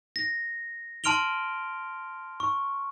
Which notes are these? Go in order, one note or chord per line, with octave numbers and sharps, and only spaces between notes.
A#6
A5 C6 F6 D7 F7 G7
C#6